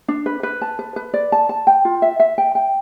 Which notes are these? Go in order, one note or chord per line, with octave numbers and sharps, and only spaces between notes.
D4
B4
B4
A5
B4
B4
D5
A5
A5
G5
F4
E5
E5
G5
G5